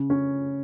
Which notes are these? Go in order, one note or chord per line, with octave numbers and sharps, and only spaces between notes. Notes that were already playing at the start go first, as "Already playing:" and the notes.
Already playing: C#3
C#4